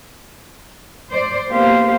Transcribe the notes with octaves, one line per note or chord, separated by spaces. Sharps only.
C5 D5
A#3 B3 G4 C5 F5